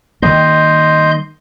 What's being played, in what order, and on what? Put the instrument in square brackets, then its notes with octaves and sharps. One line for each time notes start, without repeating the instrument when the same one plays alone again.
[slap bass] D#3 G3 A#3 [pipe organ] D#5 C6 G6